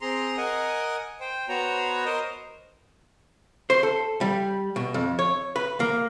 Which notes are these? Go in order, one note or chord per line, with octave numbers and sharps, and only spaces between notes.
C4 G#4 A#5 C6
A#4 D#5 F#5 G#5
C5 G5
B3 F#4 C5 C#5 A#5
A#4 C5 D#5
C5
A4
G3
B2
F2
C#5
B4
A#3